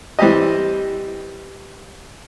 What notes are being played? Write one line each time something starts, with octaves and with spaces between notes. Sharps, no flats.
E3 G3 C4 G4 D#5